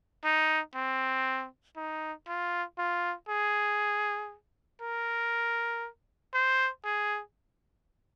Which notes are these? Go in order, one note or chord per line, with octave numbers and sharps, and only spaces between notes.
D#4
C4
D#4
F4
F4
G#4
A#4
C5
G#4